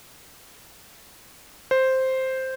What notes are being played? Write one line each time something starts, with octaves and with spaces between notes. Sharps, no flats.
C5